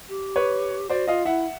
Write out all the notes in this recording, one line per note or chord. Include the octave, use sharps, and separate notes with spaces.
G4
B4 C#5
F#4 C5 D5
F4 D#5 F5
E4 E5 F#5